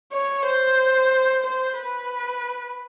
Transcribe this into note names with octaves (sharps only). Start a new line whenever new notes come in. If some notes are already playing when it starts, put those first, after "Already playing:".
C#5
C5
C5
B4